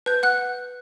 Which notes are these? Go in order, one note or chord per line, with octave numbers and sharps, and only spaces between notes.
B4 G6
F#5 F#6